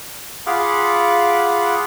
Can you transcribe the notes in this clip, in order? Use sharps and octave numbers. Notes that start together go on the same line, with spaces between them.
F4 G#4 F5 F#5 B5 D6